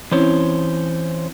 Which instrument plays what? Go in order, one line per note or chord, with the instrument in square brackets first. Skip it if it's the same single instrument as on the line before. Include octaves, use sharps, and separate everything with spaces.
[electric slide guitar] E3 C5 C#5 [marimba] C4 C#4 E4